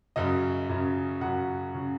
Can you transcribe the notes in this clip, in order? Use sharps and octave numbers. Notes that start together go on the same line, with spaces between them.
F#2 C#3 D#5
F#2 C#3
F#2 C#3 F#5
C#3